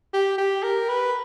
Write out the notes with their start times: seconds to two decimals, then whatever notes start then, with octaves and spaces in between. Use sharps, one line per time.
0.14 G4
0.38 G4
0.63 A#4
0.89 B4